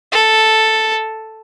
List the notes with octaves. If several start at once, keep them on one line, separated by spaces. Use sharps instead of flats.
A4